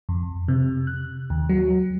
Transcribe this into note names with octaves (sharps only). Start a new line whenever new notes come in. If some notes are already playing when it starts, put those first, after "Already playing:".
F2
C3
F#6
D#2
F#3